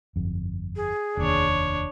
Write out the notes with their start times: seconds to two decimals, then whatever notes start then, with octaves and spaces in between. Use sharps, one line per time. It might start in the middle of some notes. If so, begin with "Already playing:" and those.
0.16 G1 F2
0.76 G#4
1.17 F1 D#2 D4 C#5